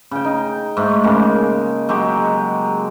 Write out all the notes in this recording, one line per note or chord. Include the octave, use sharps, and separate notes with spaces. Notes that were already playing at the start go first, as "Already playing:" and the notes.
C#3 G5
D#4
G#2 A3
C#3 G#3 A#3
F#3 G#3 G4